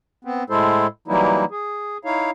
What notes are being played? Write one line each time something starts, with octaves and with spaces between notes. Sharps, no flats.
B3 C4
A2 G#3 E4 A4 C5
E3 F#3 G3 A#3 D#4 E4
G#4
D#4 E4 C#5 F5